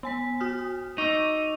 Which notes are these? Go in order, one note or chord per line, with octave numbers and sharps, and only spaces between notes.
B3 G#5 B6
F#4 D#6 F6
D#4 C#6 D6 E6